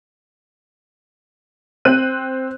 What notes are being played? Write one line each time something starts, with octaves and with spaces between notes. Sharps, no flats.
C4 F#6 D#7